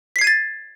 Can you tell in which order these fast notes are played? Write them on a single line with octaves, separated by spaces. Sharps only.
B6 C7 G#6 D#7 A6